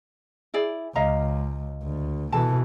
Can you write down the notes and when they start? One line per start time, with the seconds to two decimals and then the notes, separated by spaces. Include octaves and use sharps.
0.54 E4 G#4 D5
0.96 C#2 D#5 F5 A#5
1.84 D2
2.32 B2 E3 A4 A5